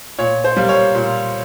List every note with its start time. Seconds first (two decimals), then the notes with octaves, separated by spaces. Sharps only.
0.18 A#2 C#5
0.44 C5
0.57 G3 A#3
0.69 C#5
0.95 A#2